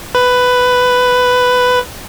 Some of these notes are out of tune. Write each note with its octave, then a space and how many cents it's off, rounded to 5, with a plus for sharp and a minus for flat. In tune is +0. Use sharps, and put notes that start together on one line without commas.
B4 +10